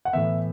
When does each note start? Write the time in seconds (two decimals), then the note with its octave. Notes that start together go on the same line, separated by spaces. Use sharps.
0.05 F#5
0.13 A2 E3 B3 E5